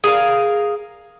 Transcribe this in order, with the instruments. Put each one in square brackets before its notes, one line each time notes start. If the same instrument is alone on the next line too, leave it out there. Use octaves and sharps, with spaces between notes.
[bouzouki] G#4 A#4 F5